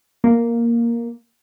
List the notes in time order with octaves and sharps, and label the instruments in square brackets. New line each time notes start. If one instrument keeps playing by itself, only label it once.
[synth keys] A#3